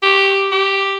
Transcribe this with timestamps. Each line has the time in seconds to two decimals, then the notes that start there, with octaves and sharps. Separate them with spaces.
0.03 G4
0.52 G4